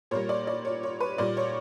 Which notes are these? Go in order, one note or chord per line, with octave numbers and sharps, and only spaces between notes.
A#2 G3 A#3 C#5
D5
D5
C#5
C#5
B4
A#2 G3 A#3 D5
C#5